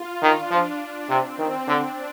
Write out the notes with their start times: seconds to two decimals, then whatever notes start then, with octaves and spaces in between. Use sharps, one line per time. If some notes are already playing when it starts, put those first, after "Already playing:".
Already playing: F4
0.21 D#3 D4
0.51 F3
1.09 C3 C4
1.38 D#3
1.67 D3 D4